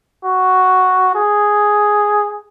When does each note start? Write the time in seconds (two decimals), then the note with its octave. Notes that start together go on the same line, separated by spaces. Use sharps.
0.24 F#4
1.15 G#4